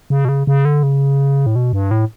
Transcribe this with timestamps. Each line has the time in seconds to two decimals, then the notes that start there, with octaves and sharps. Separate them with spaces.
0.10 C#3
0.25 B2
0.29 C#3
0.47 C#3
0.65 D3
0.83 C#3
1.46 A2
1.56 B2
1.73 G2
1.91 A2